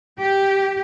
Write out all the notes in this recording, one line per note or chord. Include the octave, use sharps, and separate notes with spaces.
G4